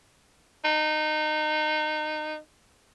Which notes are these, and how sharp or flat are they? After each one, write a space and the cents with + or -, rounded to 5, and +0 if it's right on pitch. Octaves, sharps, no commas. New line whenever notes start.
D#4 -25